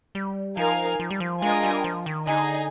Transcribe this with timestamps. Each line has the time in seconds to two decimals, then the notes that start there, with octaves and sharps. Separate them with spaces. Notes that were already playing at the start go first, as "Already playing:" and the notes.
0.15 G3
0.57 F3 D#4 A#4 F5 G#5
1.00 F3
1.10 G3
1.20 F3
1.42 G#3 D4 F4 A#4 D#5 G#5
1.63 G3
1.84 F3
2.06 D#3
2.27 D3 D#4 G#4 D#5 G#5